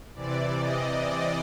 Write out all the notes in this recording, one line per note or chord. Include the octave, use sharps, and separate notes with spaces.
C3 E3 D5
D#5
D5